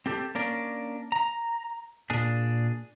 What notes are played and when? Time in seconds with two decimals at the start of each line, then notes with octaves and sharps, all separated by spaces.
0.06 C4 G4 A4
0.35 A#3 C#4 D4 A#4 D5
1.12 A#5
2.10 A#2 D4 G#4